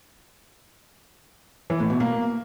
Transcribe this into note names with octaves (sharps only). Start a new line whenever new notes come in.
E3
A2
B2
A#3